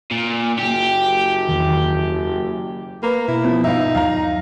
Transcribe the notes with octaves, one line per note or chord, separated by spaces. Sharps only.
A#2
F#1 G4
E2 D#3
A#3 B4
B2 E4
F3 B3
A#1 G2 D#4 E5 F5
D#2 F#3 F5 A#5